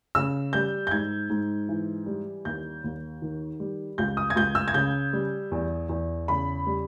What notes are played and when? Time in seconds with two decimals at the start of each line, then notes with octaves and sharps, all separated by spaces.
0.15 C#3 E6
0.53 G3 G6
0.87 G6
0.91 G#2 G#6
1.30 G#2
1.69 E3
2.06 G3
2.45 D#2 G6
2.84 D#2
3.22 D#3
3.60 G3
3.98 C#2 G6
4.17 D#6
4.30 G#6
4.36 C#2 G6
4.55 E6
4.68 G#6
4.74 C#3 G6
5.13 G3
5.52 E2
5.89 E2
6.28 C#3 B5
6.66 G3